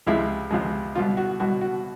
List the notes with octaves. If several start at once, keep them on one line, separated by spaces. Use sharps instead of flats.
C#2 C3 F3 G#3 E4
C#2 C3 F3 G#3
C2 B2 F#3 F4
F#4
C2 B2 F#3 F#4
F#4